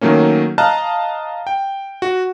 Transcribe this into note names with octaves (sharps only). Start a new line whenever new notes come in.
D#3 F#3 A3 A#3 C#4
D#5 F5 A5 A#5 F6 F#6
G5
F#4